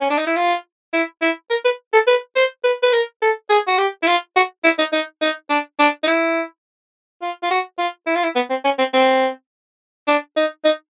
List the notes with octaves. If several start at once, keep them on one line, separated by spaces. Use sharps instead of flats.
C#4
D4
D#4
E4
F4
E4
E4
A#4
B4
A4
B4
C5
B4
B4
A#4
A4
G#4
F#4
G4
E4
F4
F#4
E4
D#4
D#4
D#4
D4
D4
D#4
E4
F4
F4
F#4
F4
E4
F4
E4
B3
C4
C#4
C4
C4
D4
D#4
D#4